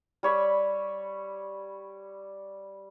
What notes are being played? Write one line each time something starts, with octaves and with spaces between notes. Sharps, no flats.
G3 C#5 B5